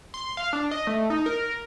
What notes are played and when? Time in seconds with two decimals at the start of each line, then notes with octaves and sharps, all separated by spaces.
0.14 C6
0.37 F5
0.53 D4
0.71 D#5
0.87 A3
1.10 D#4
1.26 A#4